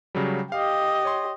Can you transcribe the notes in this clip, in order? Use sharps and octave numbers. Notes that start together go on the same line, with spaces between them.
C#3 F#3 G3
G4 D#5 F5
C#5 C6